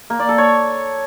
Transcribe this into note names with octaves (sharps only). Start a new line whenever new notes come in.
A#3
D5
A4
C#5